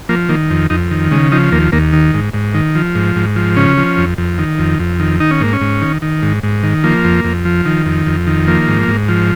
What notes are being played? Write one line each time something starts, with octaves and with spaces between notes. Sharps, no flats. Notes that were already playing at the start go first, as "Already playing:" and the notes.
F3 A#3
D#3 A#3
F2
F2 D#4
D#3
C#3 G#3
F3 D#4
D#2 A#3
D#2 A#3
D#3
G#2
G#2
D#3
F3
G#2
G#2
F3
C#3 C#4
F3
F2
F2
D#3
F2
F2
D#3
D#3 D#4
C#4
G#2 A#3
C#4
G#2
D#3
D#3
G#2
G#2
D#3
F3 A#3
F2
F2
F3
D#3
F2
F2
D#3
F3 A#3
G#2
G#2
F3